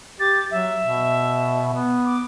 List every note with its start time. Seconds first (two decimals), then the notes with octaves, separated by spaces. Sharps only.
0.20 G4 A6
0.51 F#3 E5
0.83 B2
1.73 B3
2.05 D6